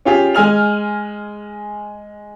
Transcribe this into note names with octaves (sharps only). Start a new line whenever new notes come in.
C#4 F4 G4 G#4
G#3 G#5 F6 F7